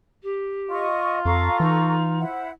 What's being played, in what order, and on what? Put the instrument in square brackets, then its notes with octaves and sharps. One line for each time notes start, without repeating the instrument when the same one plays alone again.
[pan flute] G4
[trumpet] F4 [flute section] D#5 C#6
[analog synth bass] F2 [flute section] A4 A#5 C#6 [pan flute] F5
[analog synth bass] E3 [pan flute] D#4
[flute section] E4 C5 F#5